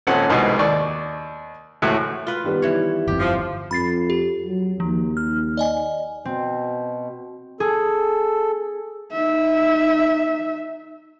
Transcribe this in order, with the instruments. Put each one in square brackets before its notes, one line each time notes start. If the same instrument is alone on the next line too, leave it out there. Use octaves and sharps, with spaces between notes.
[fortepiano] G#1 A#2 C4 C#4 A4 F#5
C2 F2 G#2 B2
D#2 D5 C#6
C#2 A2 A3 F#4 E5 F#6
[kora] F4 B4
[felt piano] D#3 G3 B3
[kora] E3 C#5
[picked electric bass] G1 F2 [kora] G4
[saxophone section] F3
[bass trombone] F2 [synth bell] B5 A6 C7
[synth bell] G4
[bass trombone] F#3
[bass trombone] D#2 [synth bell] F3
[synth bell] F6
D5 D#5 G#5
[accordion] B2 [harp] C4
[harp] G#4 [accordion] A4
[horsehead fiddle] D#4 E5